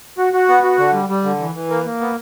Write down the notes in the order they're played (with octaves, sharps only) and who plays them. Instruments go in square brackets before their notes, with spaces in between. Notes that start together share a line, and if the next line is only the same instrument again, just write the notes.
[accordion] F#4
F#4
B3
F#4
D3
G3
G3
D3
E3
E3
A#3
A#3
B3